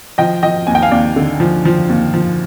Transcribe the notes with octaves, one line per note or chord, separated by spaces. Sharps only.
F3 D#5 G5
F3 D#5 G5
D#2 G#5
G5
F5 G#5
D#2 D5
D3
F3
F3
D#2
F3